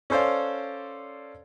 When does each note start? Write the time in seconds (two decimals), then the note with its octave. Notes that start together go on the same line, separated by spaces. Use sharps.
0.10 C#4 A4 C5 D5 F5